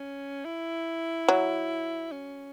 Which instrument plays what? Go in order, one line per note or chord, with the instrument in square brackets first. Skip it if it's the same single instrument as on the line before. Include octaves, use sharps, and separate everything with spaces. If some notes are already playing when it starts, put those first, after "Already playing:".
Already playing: [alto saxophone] C#4
E4
[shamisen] F#3
[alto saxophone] C#4